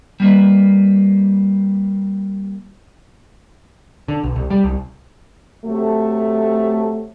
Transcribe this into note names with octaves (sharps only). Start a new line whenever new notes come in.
G3 A#3 B4
D3
B1
C2
G3
C2
C3 F#3 A3